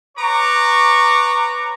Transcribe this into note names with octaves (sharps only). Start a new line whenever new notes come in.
B4 C#5 A#5 C#6 D6